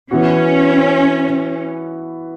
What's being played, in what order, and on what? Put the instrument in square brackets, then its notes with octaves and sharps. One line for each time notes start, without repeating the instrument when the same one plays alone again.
[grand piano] E3 B3 F#4 [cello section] C#4